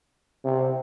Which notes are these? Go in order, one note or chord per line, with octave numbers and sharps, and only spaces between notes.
C3